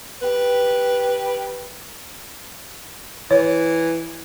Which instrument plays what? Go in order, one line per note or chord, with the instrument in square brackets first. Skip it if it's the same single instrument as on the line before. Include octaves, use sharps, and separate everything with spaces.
[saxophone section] G4 B4
[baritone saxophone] E3 [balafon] C#5